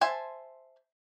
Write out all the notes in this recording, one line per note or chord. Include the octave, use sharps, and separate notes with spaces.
C5 E5 G#5 A5